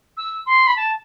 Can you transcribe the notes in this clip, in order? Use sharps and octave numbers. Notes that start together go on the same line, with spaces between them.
E6
C6
B5
A5